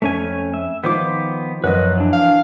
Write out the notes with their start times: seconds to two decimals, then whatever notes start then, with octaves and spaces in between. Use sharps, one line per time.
0.02 F2 A3 C#4 G#5
0.54 E5
0.84 D#3 F3 B3 F4 C5 D6
1.64 F#2 F3 B4 C#5 D#5 F#5
1.97 E3 D4
2.13 F5